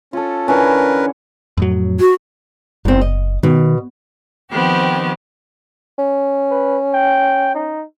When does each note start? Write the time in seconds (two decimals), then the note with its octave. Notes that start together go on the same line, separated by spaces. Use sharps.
0.13 C#4 F4 A4
0.48 D3 E3 C#4 A#4 B4
1.57 F2 A2 F#3
2.00 F#4
2.85 F#1 E2 C4
3.01 D#5
3.43 B2 D#3
4.52 D#3 F3 B3 C4 G4
5.98 C#4
6.51 B4
6.94 G5
7.55 D#4